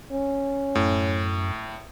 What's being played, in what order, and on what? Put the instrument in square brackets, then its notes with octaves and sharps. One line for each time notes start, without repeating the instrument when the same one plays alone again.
[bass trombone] C#4
[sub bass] F#2 [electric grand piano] A2